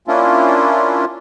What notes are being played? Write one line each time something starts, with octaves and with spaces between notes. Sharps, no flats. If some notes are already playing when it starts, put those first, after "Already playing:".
A#3 C#4 D4 E4 F4